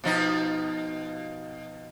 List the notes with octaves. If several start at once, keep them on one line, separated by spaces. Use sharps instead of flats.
B2 F3 D#4